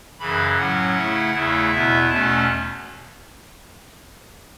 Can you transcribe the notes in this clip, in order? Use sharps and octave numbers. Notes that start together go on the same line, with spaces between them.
F#2 C#3 E3 B5
A2 F#3 C#4 F#5
C#3 A3 E4
E2 C#3 A3 E4
E2 B2 B3 E4 E5
E2 B2 A3 C#4 A5